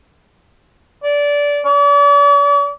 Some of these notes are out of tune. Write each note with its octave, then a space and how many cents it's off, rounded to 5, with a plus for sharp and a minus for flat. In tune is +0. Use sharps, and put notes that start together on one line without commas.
D5 -20
D5 -45